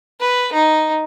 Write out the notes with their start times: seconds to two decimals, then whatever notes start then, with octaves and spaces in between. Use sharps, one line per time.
0.20 B4
0.53 D#4